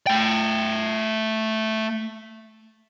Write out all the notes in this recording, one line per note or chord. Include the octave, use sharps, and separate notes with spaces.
A3 G5